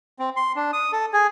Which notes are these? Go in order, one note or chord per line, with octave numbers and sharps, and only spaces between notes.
C4
C6
D4
D#6
A4
G#4